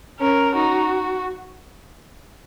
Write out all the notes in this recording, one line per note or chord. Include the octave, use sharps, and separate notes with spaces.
C#4 A#4
D#4 F#4